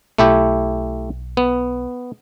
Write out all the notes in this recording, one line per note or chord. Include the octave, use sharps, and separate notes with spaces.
B1 A3 E4 G4
B3